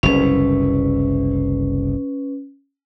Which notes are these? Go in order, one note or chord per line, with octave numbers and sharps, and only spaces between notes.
F#1 C2 C#4 B4